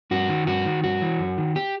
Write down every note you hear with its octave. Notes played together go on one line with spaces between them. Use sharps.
G2 F#4
D#3
G2 F#4
D#3
G2 F#4
E3
F#2
D#3
G4